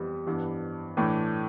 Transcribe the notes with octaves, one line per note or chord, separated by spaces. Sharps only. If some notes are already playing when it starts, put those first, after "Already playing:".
Already playing: F2 E3 G3 B3 E4
G2 E3 B3 D4
A2 E3 A3 D4